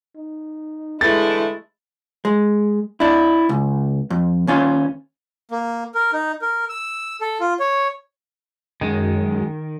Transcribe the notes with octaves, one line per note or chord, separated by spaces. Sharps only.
D#4
D3 E3 G#3 A3 E4 G#4 A6
G#3
D4 E4
C#2
F2
D#2 C#4 F4
A#3
A#4
D#4
A#4
E6
A4
F4
C#5
F#2 D#3 G#3